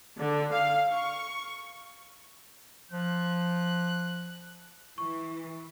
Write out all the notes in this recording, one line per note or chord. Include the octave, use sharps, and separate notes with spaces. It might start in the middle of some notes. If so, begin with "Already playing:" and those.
D3
F5
C#6
F3 F#6
E3 C#6